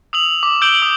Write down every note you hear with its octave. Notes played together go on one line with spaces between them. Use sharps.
D#6 E6 F7 F#7
D6
E6 G6 D7 F#7 G7
D#6